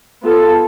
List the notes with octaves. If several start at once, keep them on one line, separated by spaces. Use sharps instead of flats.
B3 F4 A4